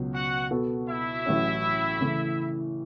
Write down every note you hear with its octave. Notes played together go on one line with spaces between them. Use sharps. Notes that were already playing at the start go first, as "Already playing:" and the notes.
Already playing: C#2 B2 F#3
F#4 F#5
B2 B3 F#4 A4
E4 E5
A1 A2 F#3 C#4
C#3 E3 A3